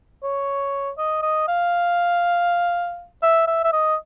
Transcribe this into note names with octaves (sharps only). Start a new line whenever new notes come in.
C#5
D#5
D#5
F5
E5
E5
E5
D#5